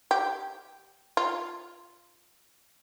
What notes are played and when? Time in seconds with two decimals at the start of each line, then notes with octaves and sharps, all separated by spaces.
0.11 G4
1.17 F4